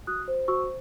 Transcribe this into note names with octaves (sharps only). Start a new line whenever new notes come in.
F#4 D#6 F#6
C5
F#4 C#6 E6